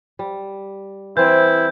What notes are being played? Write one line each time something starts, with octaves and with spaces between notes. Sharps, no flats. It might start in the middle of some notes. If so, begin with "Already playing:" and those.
G3
E3 C4 E4 G6